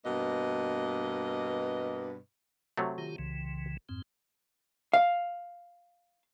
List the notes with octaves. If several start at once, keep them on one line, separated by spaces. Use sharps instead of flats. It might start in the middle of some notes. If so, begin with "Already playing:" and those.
G2 B2 A#3 B4 D#5
C3 F#3 A3
D#3 F4 G4
C2 C#3 E3
F2 G#2 C4
F5